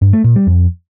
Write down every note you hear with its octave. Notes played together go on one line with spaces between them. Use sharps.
G2
A3
A#2
G3
F2